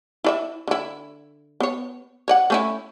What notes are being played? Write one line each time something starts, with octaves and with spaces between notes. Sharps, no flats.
E4 D5 E5
D3 E4
B3 C#5
C#5 D5 F#5
A3 C#4 E4